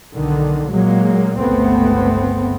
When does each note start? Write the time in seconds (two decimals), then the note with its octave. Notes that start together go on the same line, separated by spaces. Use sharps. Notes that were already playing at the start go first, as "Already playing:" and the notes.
0.13 B1 D3 D#3
0.70 A#2 F#3 G#3 A#3
1.40 G1 C#2 A3 B3 C4